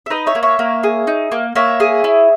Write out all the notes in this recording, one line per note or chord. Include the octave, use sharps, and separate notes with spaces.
E5
D#4 B4 D#5
C#5 E5
A#3
C#5 E5
A#3
G#4
D#4
A#3
A#3 C#5 E5
G#4
E4